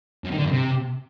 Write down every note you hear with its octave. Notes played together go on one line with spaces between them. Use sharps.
F#2
D#3
D3
F#2
C3